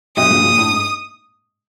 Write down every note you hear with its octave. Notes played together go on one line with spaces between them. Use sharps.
B1 B2 D#6
A#1 A#2
A#1 A#2
A2
G#2